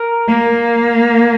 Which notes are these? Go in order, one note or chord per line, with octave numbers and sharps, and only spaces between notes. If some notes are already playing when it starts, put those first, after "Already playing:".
Already playing: A#4
A#3